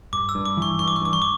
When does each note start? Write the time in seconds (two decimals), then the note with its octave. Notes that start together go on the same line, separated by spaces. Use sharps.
0.13 G2 D6
0.29 E6
0.35 G2
0.46 D6
0.57 E3 C#6
0.79 G2 C#6
0.88 D6
0.96 C#6
1.02 G2 D6
1.13 C#6
1.22 D6